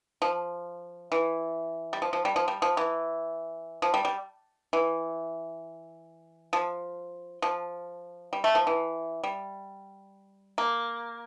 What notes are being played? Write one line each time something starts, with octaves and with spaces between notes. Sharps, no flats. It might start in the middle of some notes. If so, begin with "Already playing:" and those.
F3
E3
G3
F3
F3
G3
F3
G3
F3
E3
F3
G3
G3
E3
F3
F3
G3
A3
F3
E3
G3
A#3